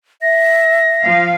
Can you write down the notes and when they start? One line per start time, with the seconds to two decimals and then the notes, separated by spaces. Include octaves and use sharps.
0.22 E5 A#6
1.05 F3 F5